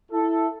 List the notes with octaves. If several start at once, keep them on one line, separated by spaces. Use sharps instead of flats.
E4 A4